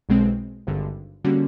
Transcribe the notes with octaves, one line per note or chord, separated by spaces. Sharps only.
B1 B2 G#3 C4
G#1 G2 D3
D3 G3 A#3 C#4 F#4